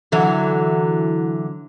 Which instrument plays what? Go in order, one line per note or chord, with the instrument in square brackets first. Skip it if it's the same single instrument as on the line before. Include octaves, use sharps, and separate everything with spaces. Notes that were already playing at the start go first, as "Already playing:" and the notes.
[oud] D3 E3 F#3